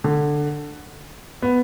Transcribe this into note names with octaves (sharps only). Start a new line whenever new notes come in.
D3
B3